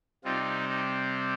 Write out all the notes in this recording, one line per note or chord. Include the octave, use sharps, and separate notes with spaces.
C3 G3 C4 D#4 F4
D#4